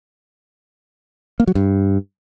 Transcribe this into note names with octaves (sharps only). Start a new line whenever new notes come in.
A#3
F#3
G2